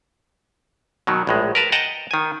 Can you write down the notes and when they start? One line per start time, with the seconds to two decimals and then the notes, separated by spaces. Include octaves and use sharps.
1.07 B2 D#3 F#3
1.27 A#1 A2 G#3
1.55 A#4 B4 A5
1.72 D#5 F#5 G5 A5 A#5
2.11 D#3 G#5